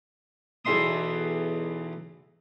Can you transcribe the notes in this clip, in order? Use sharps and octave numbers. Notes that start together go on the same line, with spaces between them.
B1 E2 E5 C6 D#6